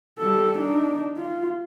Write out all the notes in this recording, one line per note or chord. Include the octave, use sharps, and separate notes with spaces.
G3 A4
D4 D#4
F4